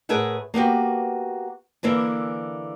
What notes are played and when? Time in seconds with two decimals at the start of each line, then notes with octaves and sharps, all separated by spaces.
0.09 A2 G#4 A#4 B4 E5 F#5
0.54 A#3 B3 F#4 G4
1.83 D3 E3 A#3 E4